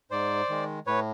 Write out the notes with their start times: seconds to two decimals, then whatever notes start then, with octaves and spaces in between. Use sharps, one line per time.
0.11 G#2 C5 D5
0.49 D#3 G#3
0.87 A2 B4 C#5